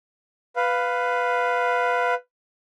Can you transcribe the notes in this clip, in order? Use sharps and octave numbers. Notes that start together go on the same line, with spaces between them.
B4 F5